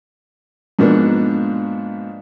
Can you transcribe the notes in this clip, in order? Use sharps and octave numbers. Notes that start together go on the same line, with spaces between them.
G#2 B2 F3 A#3 B3 D4